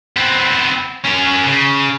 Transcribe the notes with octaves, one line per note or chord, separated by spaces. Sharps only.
B3 C4
C#4 A#4
C#3